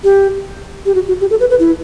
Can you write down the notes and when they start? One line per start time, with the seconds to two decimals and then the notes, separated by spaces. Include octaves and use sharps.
0.04 G4
0.86 G4
0.95 F#4
1.08 F#4
1.21 G4
1.30 A4
1.40 B4
1.50 B4
1.60 E4